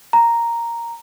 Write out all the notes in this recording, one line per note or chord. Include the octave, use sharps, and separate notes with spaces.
A#5